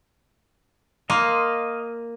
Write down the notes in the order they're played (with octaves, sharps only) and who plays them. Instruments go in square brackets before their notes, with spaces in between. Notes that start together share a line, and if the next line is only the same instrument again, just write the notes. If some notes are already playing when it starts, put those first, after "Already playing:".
[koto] A#3 [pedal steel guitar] D#5 F5 C6